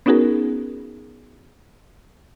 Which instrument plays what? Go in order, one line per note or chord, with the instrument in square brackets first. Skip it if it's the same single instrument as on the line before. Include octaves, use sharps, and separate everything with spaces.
[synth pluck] B3 C#4 D#4 F#4 G#4 A#4